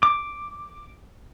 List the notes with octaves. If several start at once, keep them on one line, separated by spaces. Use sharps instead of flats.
D6